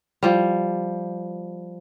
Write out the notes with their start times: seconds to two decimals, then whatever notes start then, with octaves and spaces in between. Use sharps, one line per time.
0.23 F3 G3